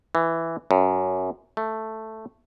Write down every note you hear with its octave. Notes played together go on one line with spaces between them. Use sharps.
E3
F#2
A3